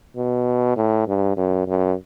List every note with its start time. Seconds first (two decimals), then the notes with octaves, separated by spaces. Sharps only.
0.17 B2
0.77 A2
1.08 G2
1.37 F#2
1.67 F#2